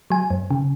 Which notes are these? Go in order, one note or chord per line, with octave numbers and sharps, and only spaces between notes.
F#3 G#5
F#2
C#3